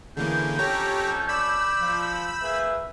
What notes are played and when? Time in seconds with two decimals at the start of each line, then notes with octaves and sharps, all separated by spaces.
0.17 D3 E3 A#3 C#4 G#4 G6
0.59 F2 C#4 G4 A4 C#5 A#5
1.29 D5 B5 E6
1.81 F3
2.42 A#3 G#4 B4 E5